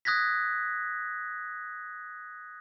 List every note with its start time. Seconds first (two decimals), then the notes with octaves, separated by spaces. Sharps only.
0.05 D#6 F#6 G#6 A#6 B6